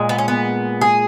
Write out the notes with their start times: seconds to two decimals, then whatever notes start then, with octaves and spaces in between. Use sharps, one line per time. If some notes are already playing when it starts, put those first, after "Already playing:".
Already playing: A#2 G#3
0.09 B3
0.18 C#4
0.28 B3
0.81 G#4